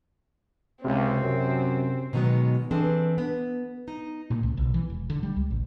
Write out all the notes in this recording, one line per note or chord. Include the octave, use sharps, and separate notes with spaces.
C#2 C3 C4
F#2
B2 D#3 F#3 G#3 B3
E3 C4 D4 G#4 A4
B3
D#4
A#2
C#2
B1
E3
E1
D3
G3
C#2
A1